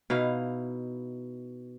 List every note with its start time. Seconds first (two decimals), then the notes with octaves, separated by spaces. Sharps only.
0.10 B2 D#4 E4 F5